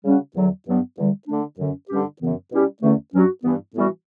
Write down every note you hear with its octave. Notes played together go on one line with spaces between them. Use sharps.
C#3 G3 C#4 F#4
E2 D3 F#3
G2 F#3 B3
E2 D3 G3
D3 A3 D4
F#2 D3 F#3 C#4
G2 D3 G3 C#4 G4
F#2 C#3 E3 B3
B2 G3 C#4 E4 G4
E2 D3 A3 C#4
G2 F#3 C#4 F#4
G2 E3 B3 E4
A2 E3 G3 B3 F#4